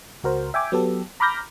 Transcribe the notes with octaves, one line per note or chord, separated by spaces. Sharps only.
C#2 F#4 A#4 C5
E5 G5 G#5 D6
F#3 B3 G4 A4
A#5 B5 D6 F6 G6 A#6